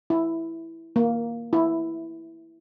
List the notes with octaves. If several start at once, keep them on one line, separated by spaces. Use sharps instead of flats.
E4
A#3
E4